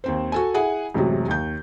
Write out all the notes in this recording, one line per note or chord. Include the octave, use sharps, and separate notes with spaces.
D#2 C4 C5
F#4 A4 G#5
E4 G#4 F#5 G#5
A1 F#2 C3 F#3 G#3
D#2 G6